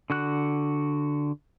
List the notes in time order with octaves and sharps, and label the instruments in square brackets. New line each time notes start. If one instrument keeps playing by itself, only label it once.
[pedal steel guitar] D3 F#4 F#6